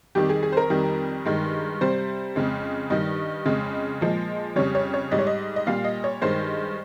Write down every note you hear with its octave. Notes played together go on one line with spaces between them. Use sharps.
F2 D#3 G3 G4
G#4
G#4
C5
A#4
F2 D#3 G3
G2 D#3 G#3
C3 G3 C5
F2 C#3 G#3
G2 D#3 G3 D#5
F2 C#3 G#3
A#2 F3 G#3
F2 C#3 G3 C#5
C#5
C#5
G#2 G3 D#5
C#5
D#5
D#5
A#2 G3 F5
D#5
C#5
G2 D#3 G#3 C5